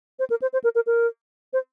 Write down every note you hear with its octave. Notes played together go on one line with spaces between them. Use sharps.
C5
A#4
C5
C5
A#4
A#4
A#4
C5